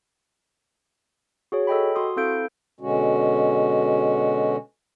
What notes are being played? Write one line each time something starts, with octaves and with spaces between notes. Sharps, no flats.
F#4 G#4 C#5
A4 D#5 G5 B5
F#4 C6 D#6
C4 E4 A4 F5 G6 D7
B2 D3 G#3 C#4 F#4